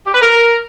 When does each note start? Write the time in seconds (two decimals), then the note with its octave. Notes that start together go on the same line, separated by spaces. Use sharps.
0.06 G4
0.13 B4
0.21 A#4